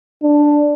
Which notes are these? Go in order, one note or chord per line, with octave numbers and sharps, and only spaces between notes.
D4